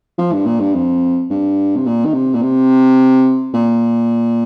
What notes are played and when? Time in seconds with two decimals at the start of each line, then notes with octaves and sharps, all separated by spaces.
0.18 F3
0.32 G2
0.46 A#2
0.60 G2
0.74 F2
1.30 G2
1.76 C3
1.86 A#2
2.05 D#3
2.14 C3
2.34 A#2
2.42 C3
3.54 A#2